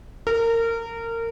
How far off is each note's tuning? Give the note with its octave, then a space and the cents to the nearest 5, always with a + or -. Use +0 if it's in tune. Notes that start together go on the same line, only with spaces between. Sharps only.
A#4 -25